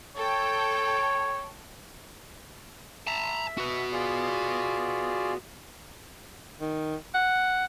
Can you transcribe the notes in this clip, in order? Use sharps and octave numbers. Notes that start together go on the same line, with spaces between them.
A4 C#5 G5
E5 A5 A#5
F#4 B4
F4 G#4 D5
D#3
F#5